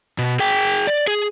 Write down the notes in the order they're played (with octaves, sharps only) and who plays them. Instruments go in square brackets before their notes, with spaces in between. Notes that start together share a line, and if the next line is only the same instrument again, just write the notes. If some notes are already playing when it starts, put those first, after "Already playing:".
[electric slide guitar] B2
G#4 G5
D5
G#4